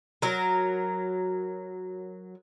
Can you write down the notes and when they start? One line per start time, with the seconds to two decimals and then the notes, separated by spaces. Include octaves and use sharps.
0.22 F#3 A#4